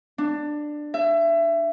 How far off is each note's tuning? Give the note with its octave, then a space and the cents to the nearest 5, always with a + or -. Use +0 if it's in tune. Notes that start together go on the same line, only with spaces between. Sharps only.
D4 +15
E5 +25